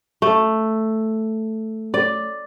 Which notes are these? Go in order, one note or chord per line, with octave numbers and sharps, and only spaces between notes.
A3
D5